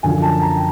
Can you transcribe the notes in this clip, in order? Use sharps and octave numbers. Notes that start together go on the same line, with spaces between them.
F#2 D3 F3 G#5
A5
A#5
G5